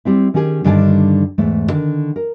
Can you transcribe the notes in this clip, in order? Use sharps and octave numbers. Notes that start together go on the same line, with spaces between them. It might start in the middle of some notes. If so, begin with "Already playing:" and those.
G3 C4 E4
D#3 C#4 G4 G#4
G2 D3 D#3 G3 G#5 A5
E2 G#2 A3
D3 D#3
A#4